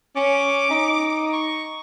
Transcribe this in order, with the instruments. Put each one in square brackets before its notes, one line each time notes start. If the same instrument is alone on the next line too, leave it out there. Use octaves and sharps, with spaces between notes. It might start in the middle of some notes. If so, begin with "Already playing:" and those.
[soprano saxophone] C#4 [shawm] D6
[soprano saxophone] D#4
[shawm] C#6